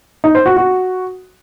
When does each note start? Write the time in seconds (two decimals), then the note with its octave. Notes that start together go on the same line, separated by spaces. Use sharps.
0.24 D#4
0.35 C5
0.46 F#4
0.57 F#4